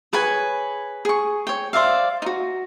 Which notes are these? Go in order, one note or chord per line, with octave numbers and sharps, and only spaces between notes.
G#4 B4 C#5 G#5
G#4 C#6
C#5 G5
C5 D5 E5 F5
D#4 F#4